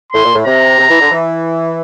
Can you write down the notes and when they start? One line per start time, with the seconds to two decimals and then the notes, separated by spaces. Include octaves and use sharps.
0.12 A2 C6
0.24 A#2
0.34 A2
0.46 C3 A#5
0.78 C3
0.89 E3
1.00 D3
1.11 E3